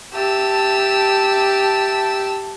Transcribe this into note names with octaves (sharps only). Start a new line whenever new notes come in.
G4 E5 A5 E6